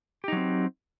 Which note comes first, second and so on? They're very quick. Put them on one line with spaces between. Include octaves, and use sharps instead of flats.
G4 D#4 F#3 C4